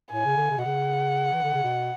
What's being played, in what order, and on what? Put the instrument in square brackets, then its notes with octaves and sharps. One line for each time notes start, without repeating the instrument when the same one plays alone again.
[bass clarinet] A2 [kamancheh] G#5
[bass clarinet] C#3
D3
C#3
B2
[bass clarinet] C#3 [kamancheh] F#5
[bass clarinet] E3
D3
C#3
B2